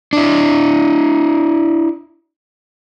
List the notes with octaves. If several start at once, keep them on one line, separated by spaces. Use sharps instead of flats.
D4 E4